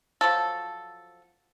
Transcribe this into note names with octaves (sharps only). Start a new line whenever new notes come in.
F3 F#3 A4